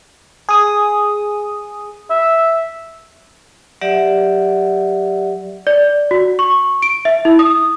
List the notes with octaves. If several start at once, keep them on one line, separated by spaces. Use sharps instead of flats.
G#4 D#6
E5
F#3 G4 D5 E5 F#5
D5
F#4
C#6
D7
E5
E4
D#6